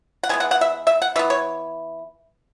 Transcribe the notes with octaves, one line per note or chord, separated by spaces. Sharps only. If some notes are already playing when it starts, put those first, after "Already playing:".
F#5
E3 G#3 B3 G#5
F#5
F#5
E5
E5
F#5
E3 B3 E5
C#5